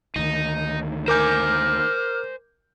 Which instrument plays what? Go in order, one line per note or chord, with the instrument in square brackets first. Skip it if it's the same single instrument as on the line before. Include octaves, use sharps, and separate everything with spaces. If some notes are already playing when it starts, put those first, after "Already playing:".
[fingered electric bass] D2 D#3 [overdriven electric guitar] D#4
[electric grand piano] A#4 D6 G6 [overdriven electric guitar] C5 G#5 [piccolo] F6